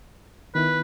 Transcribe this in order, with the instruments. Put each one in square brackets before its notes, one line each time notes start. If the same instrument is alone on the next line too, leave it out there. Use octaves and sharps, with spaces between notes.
[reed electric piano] D#3 B3 E4 [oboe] B4